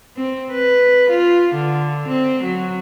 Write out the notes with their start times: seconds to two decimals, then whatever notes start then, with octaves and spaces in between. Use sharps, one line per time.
0.16 C4
0.52 B4
1.10 F4
1.54 D3
2.08 C4
2.44 F#3